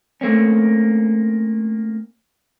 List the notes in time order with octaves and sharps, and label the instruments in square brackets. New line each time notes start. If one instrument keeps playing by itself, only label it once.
[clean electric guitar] A3 A#3 C4 C#4